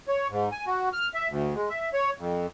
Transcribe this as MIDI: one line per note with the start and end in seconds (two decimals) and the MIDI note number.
0.08 0.28 73
0.30 0.49 44
0.52 0.65 80
0.67 0.89 66
0.93 1.08 89
1.14 1.28 76
1.29 1.54 38
1.55 1.69 56
1.69 1.90 76
1.93 2.10 73
2.18 2.46 41